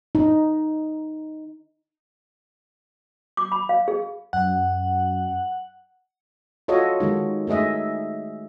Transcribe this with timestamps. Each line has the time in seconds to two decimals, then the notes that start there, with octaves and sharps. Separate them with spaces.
0.15 D#4
3.37 D6
3.52 B5
3.69 F5
3.88 G#4
4.33 F#2 F#5
6.68 F4 F#4 A4 C#5 D#5
7.00 D#3 G#3 D#4
7.47 A3 D#4 G#4 D#5 E5